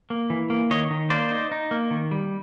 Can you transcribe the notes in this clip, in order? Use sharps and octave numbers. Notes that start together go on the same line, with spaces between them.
A#3
E3
A#3
D#3 C#5 D#5
D#3
A#3 C5 D5
D#4
D#4
A#3
D#3
G3